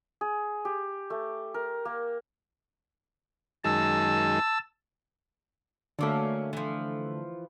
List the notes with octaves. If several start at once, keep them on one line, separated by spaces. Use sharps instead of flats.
G#4
G4
A3
A#4
A#3
F#2 D#3 G#3 A5 E6
D3 F#3 A3 A#3 C#4
E3 F3